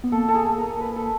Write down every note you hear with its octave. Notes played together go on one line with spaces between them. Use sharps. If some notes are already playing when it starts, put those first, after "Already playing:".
B3
A#3 A4
A4
G#4
A#4
B4
A4